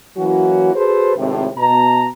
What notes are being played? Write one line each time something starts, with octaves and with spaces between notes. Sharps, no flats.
E3 F#3 A#3 C#4 E4 F#4
F#4 G#4 A4 B4 C5
G#1 A2 C3
B2 A5 A#5